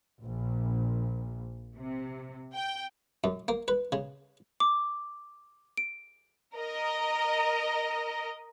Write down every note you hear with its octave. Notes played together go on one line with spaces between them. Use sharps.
A#1
C3
G5
F#2
A#3
B4
C#3
D6
D7
A#4 D#5